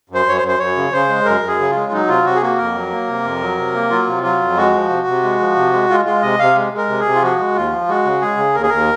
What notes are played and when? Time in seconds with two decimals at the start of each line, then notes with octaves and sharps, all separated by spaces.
0.09 F#2
0.15 C5
0.26 F#2 C#5
0.37 C5
0.43 F#2
0.48 C5
0.59 F#2 C#5
0.76 C#3
0.93 C#3 C5
1.09 G#3
1.25 F#2 A#4
1.42 F#2
1.48 G#4
1.59 C#3
1.70 G#3 F4
1.92 F#3 D#4
2.08 C3 F4
2.24 C3 F#4
2.35 G#4
2.42 A#3 F#4
2.58 F2 A#4
2.75 F#3
2.92 A#3
3.08 C3
3.24 F2
3.41 F#3
3.57 C3
3.74 A#3
3.90 F#3 F4
4.07 C3
4.23 F#3 F4
4.41 F2
4.57 G#3 F#4
4.73 F3
4.90 C3
5.07 C3
5.23 G#3
5.40 F3
5.56 C3
5.73 G#3
5.89 G#3 F4
6.05 G#3 F4
6.22 C3 D#5
6.39 C3 F5
6.56 G#3
6.72 G#3
6.77 A#4
6.89 C3
7.00 G#4
7.05 C3
7.15 F4
7.22 F3 F#4
7.39 G#3
7.55 D#2 F4
7.72 F3
7.89 G#3 F#4
8.05 C#3
8.21 G#3 G#4
8.37 C#3
8.55 D#2 A#4
8.63 G#4
8.69 D#2 A#4